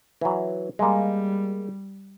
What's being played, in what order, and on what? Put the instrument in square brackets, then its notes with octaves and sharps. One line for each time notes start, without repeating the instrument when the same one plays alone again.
[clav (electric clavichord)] E3 F#3
[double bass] G3 [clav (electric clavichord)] G#3 A#3